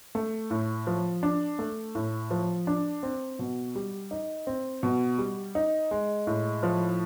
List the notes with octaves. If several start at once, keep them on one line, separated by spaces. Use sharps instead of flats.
A3
A2
F3
D4
A3
A2
F3
D4
C4
B2
G3
D#4
C4
B2
G3
D#4
G#3
A2
F3